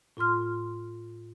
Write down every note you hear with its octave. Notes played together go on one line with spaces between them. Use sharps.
A2 F4 C6 F6